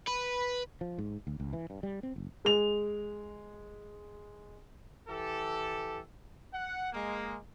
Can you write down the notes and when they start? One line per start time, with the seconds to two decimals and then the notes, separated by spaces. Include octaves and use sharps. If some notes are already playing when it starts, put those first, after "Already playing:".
0.08 B4
0.81 F3
0.98 G#2
1.27 D2
1.40 C#2
1.53 E3
1.70 G2
1.83 G3
2.03 C4
2.16 F#1
2.45 G#3 F7
5.08 E3 G4 A4
6.53 F#5
6.93 G#3 A#3